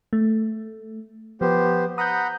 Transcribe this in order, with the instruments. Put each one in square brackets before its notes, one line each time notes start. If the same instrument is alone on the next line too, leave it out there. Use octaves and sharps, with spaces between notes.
[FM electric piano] A3
[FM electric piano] F3 [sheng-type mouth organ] B3 G4 C5
[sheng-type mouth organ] F#5 A#5 B5 [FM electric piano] D#6 G6